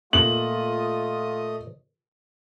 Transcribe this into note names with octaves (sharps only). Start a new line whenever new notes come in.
A#2 A3 A#3 F4 D#5 D#6 F#7